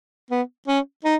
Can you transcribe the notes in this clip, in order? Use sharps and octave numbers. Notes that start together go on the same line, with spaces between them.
B3
C#4
D#4